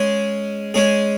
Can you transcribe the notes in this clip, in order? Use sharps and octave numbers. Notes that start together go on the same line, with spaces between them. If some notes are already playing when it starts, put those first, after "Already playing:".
Already playing: G#3 C#4 G#4
G#3 C#4 G#4